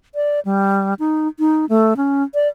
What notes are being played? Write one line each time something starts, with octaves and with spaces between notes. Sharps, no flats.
D5
G3
D#4
D#4
A3
C#4
D5